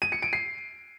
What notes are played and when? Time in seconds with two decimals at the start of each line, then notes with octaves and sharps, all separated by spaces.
0.02 D#7
0.12 C#7
0.22 D7
0.33 C7